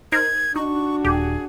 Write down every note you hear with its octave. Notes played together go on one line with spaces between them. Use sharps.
D#4 A#4 C5 G#6
D4 D#4 F#4 C#6
D#1 G4 G#4